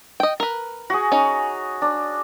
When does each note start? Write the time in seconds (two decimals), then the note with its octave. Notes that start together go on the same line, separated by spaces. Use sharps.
0.20 D#5 G5
0.40 A#4 B4
0.90 F#4 G#4
1.12 C#4 D#4
1.82 D4